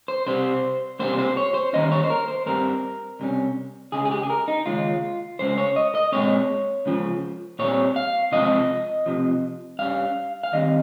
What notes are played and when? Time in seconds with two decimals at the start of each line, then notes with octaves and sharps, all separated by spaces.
0.08 C5
0.26 C2 C3 G3 C5
0.99 C3 G3 A#3 C5
1.19 C5
1.37 C#5
1.54 C5
1.73 D#2 D#3 G3 A#3 C#4 D#5
1.92 C#5
2.04 C5
2.10 A#4
2.28 C5
2.46 G2 G3 C4 A#4
3.20 C2 C3 G3 C#4
3.92 C#2 C#3 G#3 G#4
4.05 G#4
4.11 G4
4.23 G#4
4.30 A#4
4.48 D#4
4.66 D#2 C#3 G#3 C#4 F4
5.39 C#2 C#3 G#3 C#4 C5
5.58 C#5
5.76 D#5
5.95 D#5
6.12 A#2 G#3 C4 C#5
6.86 C#2 C#3 F3
7.59 A#2 G3 C4 C#5
7.96 F5
8.32 C3 F3 G#3 C4 D#5
9.06 F2 C3 F3
9.79 G2 G3 C#4 F5
10.43 F5
10.52 D#2 D#3 G3 C4 D#5